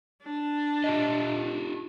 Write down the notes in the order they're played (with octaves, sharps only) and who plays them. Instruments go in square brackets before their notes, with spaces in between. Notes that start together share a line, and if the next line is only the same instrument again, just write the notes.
[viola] D4
[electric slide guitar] F4 G4 D#5